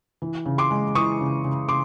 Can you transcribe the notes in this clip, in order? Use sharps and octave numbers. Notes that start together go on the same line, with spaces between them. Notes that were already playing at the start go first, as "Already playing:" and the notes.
E3
C#3
C6 D6
G#3
E3 C#6 D#6
C#3
C#3
C#3 C6 D6